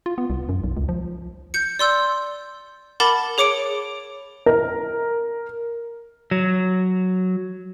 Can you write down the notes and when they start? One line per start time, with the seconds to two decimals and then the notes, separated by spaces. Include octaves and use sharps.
0.06 F4
0.18 B3
0.30 C2
0.49 F#2
0.64 B1
0.77 C#2
0.89 F3
1.54 G6 C#7
1.79 D5 C6 E6 G6
3.00 A#4 F#5 A5 B5 D6 A6
3.38 G#4 C#5 D6 C#7 D7
4.46 A#4
6.31 F#3